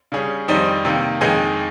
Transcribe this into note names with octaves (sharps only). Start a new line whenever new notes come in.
C#3 G3 C#4 G#4
F2 D#3 G3 C4 D#4
C3 D#3 A#3
F2 D#3 G#3 D#4 G#4